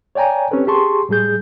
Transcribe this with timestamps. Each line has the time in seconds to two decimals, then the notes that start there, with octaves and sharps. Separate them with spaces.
0.15 C#5 D5 G5 G#5 A#5
0.51 C4 C#4 G4 A4 B4
0.67 G4 G#4 A5 C6 C#6
1.09 A2 G3 G#4 G6